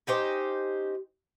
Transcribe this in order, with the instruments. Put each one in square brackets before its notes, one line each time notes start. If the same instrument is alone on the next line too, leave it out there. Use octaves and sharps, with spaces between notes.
[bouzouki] C#4 D#4 G4 C5